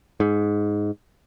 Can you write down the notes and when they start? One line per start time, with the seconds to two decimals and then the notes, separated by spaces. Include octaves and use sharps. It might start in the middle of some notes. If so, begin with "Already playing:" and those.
0.20 G#2